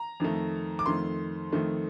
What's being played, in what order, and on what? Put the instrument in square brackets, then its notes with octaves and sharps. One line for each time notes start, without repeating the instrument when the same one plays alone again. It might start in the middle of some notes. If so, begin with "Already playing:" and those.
Already playing: [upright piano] A#5
F2 D#3 A3
D6
F2 D#3 A3 C6
F2 D#3 A3